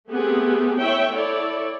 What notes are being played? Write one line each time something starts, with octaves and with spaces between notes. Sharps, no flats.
A3 B3 C4 G4 G#4
A3 E4 C#5 E5 G5
E4 A4 C#5 D5